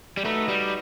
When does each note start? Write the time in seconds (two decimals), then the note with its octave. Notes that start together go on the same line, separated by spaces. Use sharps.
0.17 G3
0.25 A3 D#4 F#4 B4
0.48 G3